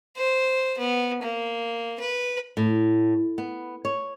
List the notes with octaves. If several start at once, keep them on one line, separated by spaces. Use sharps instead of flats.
C5
B3
A#3
B4
A2
B3
C#5